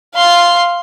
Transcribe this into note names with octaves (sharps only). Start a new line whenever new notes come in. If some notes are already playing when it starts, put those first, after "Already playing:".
F5 C6